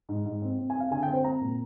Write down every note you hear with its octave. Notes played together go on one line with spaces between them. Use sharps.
G#2
G#2
C4
C4
G#5
C4
F5
D3 G#5
G5
C4
C5
C4 A#5
A#2